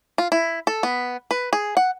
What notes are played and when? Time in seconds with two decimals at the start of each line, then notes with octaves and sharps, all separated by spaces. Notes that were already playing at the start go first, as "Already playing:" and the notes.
0.18 F4
0.32 E4
0.67 A4
0.83 B3
1.31 B4
1.53 G#4
1.77 F#5